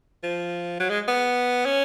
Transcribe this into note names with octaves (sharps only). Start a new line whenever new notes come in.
F3
F#3
G#3
B3
C#4